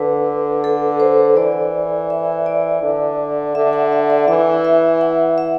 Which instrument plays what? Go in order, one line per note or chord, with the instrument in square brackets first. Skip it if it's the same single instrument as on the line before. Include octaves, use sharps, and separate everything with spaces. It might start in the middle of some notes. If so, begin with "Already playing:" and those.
Already playing: [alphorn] D3 [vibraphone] B4
[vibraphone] A4
C5
[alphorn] E3 [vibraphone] D5
[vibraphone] E5
D5
[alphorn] D3
[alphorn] D3 [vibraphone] E5
[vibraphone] F#5
E5
D5
[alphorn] E3 [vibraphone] E5
[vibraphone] E5
F#5
E5